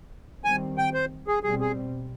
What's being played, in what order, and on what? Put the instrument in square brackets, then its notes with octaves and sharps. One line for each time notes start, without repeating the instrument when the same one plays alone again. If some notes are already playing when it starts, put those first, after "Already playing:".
[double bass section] D#3 G3 C4 [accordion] G#5
[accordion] G5
C5
G#4
[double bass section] B2 G3 C4 [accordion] G#4
[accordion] G#4